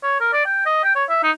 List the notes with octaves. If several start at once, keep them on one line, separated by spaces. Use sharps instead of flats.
C#5
A#4
D5
G5
D#5
G5
C#5
E5
D#4